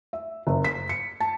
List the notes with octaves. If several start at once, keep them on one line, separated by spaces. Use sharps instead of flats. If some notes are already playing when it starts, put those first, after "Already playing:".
E5
F#1
B6
C#7
A5